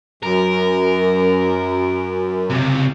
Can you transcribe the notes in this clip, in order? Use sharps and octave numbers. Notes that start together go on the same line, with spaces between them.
F#2 A#4
C#2 C3